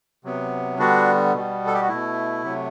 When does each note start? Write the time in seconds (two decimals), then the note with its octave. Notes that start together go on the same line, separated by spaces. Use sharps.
0.24 C3 F#3 B3
0.79 D3 G3 B3 D4 F#4
1.34 B2 G3 B3
1.67 A4
1.74 G4
1.81 F#4
1.88 B2 A3 E4
2.43 C3 F#3 A3